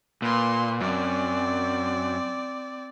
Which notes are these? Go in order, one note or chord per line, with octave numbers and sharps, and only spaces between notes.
A#2 B4 C6
F#2 C4 D5